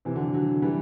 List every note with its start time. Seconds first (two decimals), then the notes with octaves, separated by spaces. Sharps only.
0.05 C3 E3
0.15 D3 F#3
0.34 D3 F#3
0.62 E3 G3